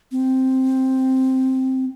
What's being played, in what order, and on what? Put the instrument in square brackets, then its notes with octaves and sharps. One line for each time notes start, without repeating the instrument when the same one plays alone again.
[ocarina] C4